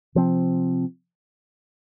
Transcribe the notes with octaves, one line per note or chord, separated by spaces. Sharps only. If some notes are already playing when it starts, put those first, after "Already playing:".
C3 F3 C4